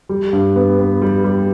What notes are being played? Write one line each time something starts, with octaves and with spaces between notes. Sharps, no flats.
G3
G2
B3
B3
G3
G3